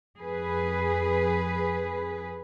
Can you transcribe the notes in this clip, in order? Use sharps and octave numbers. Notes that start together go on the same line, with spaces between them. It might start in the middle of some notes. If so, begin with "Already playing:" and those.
F2 G#4 B4